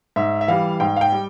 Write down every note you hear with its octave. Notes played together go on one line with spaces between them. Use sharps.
G#2 E5
E5
E3 G3 F5
G#2 G5
F5
G5
G3